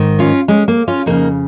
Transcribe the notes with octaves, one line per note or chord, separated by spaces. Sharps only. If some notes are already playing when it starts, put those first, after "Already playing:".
Already playing: G#2 D#3
C#4 F4
G#3 C#4
A#3
C#4 F4
F2 C#3 A#3 D#4